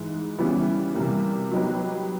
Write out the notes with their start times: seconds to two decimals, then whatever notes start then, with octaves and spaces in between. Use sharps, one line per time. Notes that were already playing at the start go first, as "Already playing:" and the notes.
Already playing: G#2 E3 G#3
0.38 C#3 E3 G3 B3 E4
0.94 C3 E3 G3 A#3
1.51 F#3 B3 D#4 G4 B4